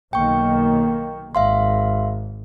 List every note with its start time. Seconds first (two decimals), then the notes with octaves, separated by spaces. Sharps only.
0.13 B1 D#3 A#3 G5 C#6
1.35 G#1 E5 F5 C6